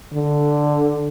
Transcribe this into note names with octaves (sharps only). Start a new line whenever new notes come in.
D3